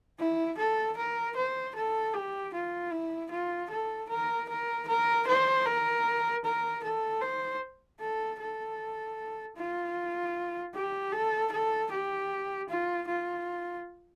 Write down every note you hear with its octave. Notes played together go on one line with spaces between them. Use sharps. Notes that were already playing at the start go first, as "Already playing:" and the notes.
E4
A4
A#4
C5
A4
G4
F4
E4
F4
A4
A#4
A#4
A#4
C5
A#4
A#4
A4
C5
A4
A4
F4
G4
A4
A4
G4
F4
F4